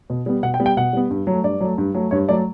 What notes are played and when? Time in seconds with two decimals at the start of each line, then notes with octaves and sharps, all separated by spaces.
0.10 B2
0.26 G3 B3
0.43 B2 F#5
0.54 G5
0.60 G3 B3
0.66 G5
0.77 B2 F#5
0.93 G3 B3
1.10 G2
1.27 F#3 A3
1.44 G2 D5
1.61 F#3 A3
1.78 G2
1.95 F#3 A3
2.11 G2 C#5
2.28 F#3 A3 D5